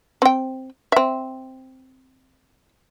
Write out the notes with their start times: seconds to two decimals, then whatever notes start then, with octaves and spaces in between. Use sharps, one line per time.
0.22 C4 G5
0.92 C4 E5